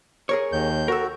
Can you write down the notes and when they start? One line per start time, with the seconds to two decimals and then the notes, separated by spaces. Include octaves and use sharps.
0.29 G#4 A#4 C#5
0.52 D#2 G6
0.88 F#4 A4 A#4